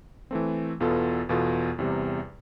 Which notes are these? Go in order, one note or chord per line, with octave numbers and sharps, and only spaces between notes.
E3 A3 C4
E2 B2 B3 F4 A4
E2 B2 B3 F4 A4
E2 C3 G3